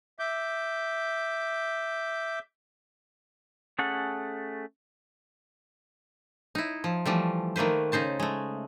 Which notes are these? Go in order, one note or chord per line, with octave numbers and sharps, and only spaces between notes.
E5 D6 G6
A3 C#4 G#4 A4 F#5
D#4 E4
F3
E3 F3 G3 A3
D#3 A3 A#3 B4 C5
C#3 D#4 C5 A5
G#3 A3